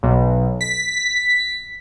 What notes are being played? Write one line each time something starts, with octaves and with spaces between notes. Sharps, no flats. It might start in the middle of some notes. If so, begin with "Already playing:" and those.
B1
B6